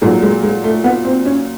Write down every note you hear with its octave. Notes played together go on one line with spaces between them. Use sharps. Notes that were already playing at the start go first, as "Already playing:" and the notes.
A#2 F#3 G#3
G#3
G#3
A3
B3
C4
C#4